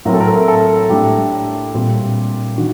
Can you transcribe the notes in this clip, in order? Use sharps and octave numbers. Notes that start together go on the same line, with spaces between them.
A2 F#3 C4 A#4
A4
A#4
A4
A2 A3 D4 G4
A#2 G3 C4
D#3 F#4